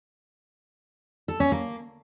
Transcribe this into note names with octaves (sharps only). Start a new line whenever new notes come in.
A4
C#4
A#3